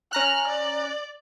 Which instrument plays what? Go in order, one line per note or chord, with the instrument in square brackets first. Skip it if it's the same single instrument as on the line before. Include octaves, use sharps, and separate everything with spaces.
[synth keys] C#4 A#5 F#6 [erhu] F6
[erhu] D5